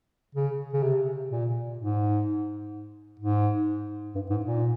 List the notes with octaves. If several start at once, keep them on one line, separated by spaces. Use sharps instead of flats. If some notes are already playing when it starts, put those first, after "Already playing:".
C#3
C#3
C3
A#2
G#2
G#2
G2
G#2
A#2